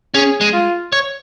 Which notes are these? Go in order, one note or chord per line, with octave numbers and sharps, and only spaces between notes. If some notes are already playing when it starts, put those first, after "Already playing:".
C#4 G#4
G#3
F4
C#5